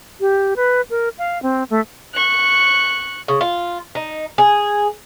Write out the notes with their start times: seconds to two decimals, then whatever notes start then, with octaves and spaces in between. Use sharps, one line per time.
0.20 G4
0.56 B4
0.90 A#4
1.18 F5
1.43 C4
1.70 A3
2.14 C#6 F#6
3.28 C#3
3.41 F4
3.95 D#4
4.38 G#4